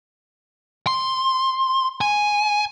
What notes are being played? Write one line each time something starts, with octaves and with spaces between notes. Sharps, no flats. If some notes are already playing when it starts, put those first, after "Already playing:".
C6
G#5